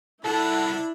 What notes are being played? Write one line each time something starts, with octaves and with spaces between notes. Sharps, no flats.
C2 D4 E4 A4 F#5